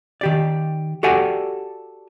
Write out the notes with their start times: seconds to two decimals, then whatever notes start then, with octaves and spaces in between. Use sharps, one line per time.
0.21 D#3 G4 D5
1.03 F#4 G4 A4 D5 F#5 G#5